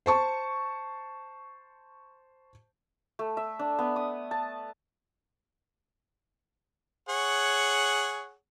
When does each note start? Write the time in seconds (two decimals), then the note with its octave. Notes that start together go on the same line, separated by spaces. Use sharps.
0.06 C5 A5 C#6
3.19 A3
3.37 E5
3.59 D4
3.79 B3
3.96 D#6
4.31 A5
7.09 G#4 C#5 F#5